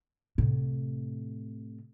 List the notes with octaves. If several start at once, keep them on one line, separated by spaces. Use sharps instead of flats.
A2 C3